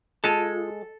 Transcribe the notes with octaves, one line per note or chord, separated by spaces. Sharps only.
G#3 F4 A4 A5